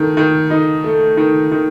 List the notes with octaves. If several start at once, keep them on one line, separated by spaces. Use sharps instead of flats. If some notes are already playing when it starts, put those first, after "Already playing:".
Already playing: D#3 A3
D#3
D#4
A3
D#3
D#3